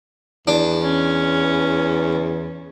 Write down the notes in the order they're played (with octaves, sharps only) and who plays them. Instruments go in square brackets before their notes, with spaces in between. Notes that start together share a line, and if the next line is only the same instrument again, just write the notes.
[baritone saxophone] E2 [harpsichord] D4
[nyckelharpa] C#4